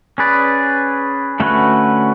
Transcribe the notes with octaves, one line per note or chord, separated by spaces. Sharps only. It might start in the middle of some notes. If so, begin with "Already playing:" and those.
C#4 G#4 B4 D5
D3 A3 C#4 F#4 B4